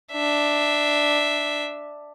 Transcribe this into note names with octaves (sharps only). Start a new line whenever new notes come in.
D4 E5